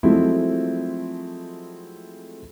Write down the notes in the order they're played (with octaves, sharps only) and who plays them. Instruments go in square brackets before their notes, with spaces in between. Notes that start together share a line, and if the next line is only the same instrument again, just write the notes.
[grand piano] F3 F#3 G#3 A3 C4 E4